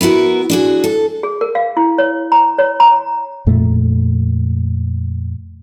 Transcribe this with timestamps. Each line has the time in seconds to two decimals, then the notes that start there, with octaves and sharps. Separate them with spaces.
0.01 B3 E4 F#4 A#4
0.50 D4 F#4 G#4
0.84 A4
1.23 G#4
1.41 A#4
1.55 F5
1.77 E4
1.98 C#5
2.32 A#5
2.59 C#5
2.80 A#5
3.47 F2 A#2 A3